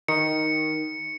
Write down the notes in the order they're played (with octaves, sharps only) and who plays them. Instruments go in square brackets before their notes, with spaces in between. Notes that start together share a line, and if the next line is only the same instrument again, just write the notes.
[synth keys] D#3 [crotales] C#7